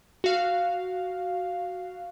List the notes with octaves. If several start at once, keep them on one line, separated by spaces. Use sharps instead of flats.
F#4 F5